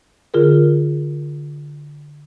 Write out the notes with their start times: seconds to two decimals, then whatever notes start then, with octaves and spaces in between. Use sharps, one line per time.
0.34 D3 F4 G#4 A#4